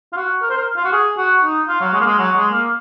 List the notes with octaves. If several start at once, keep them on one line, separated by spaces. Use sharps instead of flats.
F4
F#4
A#4
C5
A#4
F4
F#4
G#4
F#4
D#4
F4
F#3
G#3
A#3
G#3
F#3
G#3
A#3